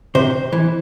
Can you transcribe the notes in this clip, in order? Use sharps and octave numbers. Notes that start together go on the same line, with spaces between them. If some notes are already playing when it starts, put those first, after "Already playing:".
C3 C5
E3